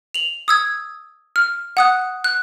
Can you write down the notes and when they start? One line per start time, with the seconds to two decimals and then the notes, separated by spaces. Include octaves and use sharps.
0.14 F7 F#7
0.48 D#6 E6 G#6
1.36 F6
1.77 F#5 D#6 F#6
2.24 F#6